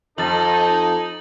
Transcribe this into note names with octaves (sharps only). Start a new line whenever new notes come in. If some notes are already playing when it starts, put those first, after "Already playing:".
F2 D#4 A4 A6 F#7